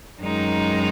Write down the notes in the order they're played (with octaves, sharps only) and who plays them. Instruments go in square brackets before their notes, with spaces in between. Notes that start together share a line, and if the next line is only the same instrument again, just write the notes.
[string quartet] F#2 D#3 G#3 D#4